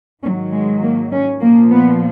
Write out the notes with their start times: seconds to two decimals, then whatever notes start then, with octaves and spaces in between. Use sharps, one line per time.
0.24 G#2 D#3 F#3 C#4
0.53 G#3
0.83 A#3
1.12 C#4
1.41 A#2 F3 A#3
1.71 B3